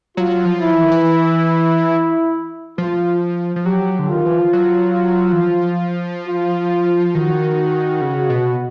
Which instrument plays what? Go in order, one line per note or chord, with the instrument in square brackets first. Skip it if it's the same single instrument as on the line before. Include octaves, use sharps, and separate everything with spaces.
[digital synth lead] F#3 [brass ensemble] F4
[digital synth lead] F3
[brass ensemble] E4
[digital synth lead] E3
D#3
E3
[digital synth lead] F3 [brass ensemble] F4
[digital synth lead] F3
[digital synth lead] F#3 [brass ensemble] G4
[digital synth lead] D3
[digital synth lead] D#3 [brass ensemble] F4
[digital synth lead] E3
F3
F#3
E3
F3
[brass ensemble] F4
[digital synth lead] D#3 [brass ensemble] F#4
[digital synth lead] C#3
B2